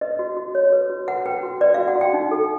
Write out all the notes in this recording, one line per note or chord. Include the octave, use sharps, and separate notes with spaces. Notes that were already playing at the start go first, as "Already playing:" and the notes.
B4 D#5
F#4
F#4
F#4 C#5
B4
F#4
B4 F#5
B4 G5
F#4
B4 D5
F#4 F5
F#5
F#4
G5
D#4
A4